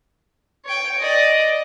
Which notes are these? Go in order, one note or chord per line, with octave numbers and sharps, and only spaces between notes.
C#5 G5
D5 D#5